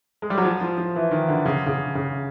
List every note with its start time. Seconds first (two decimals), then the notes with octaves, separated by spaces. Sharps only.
0.22 G#3
0.30 G3
0.38 F#3
0.45 F3
0.61 F3
0.78 F3
0.96 E3
1.11 D#3
1.28 D3
1.46 C#3
1.66 C#3
1.95 C#3